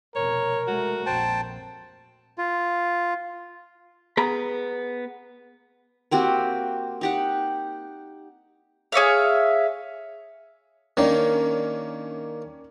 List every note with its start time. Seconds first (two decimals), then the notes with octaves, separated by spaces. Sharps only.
0.16 F1 B2 A#4 C#5
0.68 G#3 A3 F#4
1.06 A#1 F2 C5 G5 A5
2.38 F4
4.17 B3 G#4 A#5 B5
6.11 A#3 C4 F#4 G4
7.01 D#4 G4 F#5
8.92 G#4 C#5 E5 F5
10.97 D#3 A#3 C#4 D4